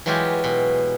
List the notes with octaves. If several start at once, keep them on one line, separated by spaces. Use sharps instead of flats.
E3 F#3 G#3 E4 F4 G4
B2